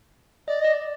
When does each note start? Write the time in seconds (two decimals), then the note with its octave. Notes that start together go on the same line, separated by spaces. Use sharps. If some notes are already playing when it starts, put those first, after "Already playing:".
0.48 D5 D#5
0.61 D5 D#5
0.73 D5